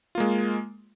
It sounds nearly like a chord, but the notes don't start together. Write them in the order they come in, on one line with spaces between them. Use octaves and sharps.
F4 A#3 G#3